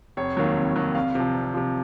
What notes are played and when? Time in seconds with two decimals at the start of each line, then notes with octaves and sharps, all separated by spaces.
0.17 F1 C#5
0.37 D#2 D#3 F#3
0.57 F1
0.76 D#2 D#3 F#3
0.95 C2 F5
1.15 C3 F3
1.35 C2
1.54 C3 F3